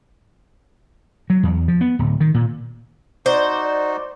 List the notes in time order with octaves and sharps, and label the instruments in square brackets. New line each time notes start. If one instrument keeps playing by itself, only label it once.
[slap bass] F#3
E2
F3
B3
D1
D#3
A#2
[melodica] D#4 F#4 [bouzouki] C5 [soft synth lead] D5